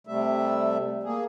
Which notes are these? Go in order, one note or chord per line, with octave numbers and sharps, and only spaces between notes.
C3 G3 A3 E5
A#3 G#4